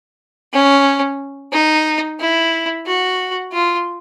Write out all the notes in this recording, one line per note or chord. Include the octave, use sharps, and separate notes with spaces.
C#4
D#4
E4
F#4
F4